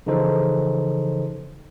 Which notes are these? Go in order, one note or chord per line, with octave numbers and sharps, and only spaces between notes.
C#3 E3 F3 D#4 A4 C5